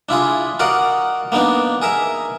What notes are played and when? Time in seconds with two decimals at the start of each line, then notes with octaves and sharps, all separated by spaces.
0.09 D4 E4 F4 G#4
0.59 F#4 A#4 D5 D#5 F5 F#5
1.32 A#3 B3 D4 D#4
1.82 G#4 A#4 E5